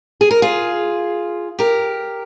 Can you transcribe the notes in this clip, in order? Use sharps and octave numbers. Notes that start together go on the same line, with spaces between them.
G#4
A#4
F4 G#4
G4 A#4